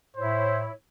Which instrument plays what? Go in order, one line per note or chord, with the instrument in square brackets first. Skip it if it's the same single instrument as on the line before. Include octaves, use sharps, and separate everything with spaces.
[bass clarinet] A2 [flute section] E4 C#5 [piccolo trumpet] C5